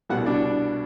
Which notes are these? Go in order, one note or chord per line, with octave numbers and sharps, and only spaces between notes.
C2 B2 G3 F#4 F#5
D4 D5